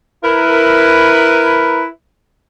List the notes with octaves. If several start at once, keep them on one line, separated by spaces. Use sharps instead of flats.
E4 A#4 B4